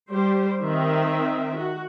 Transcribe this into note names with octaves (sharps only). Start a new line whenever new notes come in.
G3 G4 C5
D#3 C4 E5
F#4